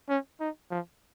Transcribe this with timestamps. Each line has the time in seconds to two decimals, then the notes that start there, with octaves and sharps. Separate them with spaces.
0.09 C#4
0.40 D#4
0.70 F3